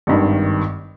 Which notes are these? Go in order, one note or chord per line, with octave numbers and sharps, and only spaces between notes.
G#1 G2 D#3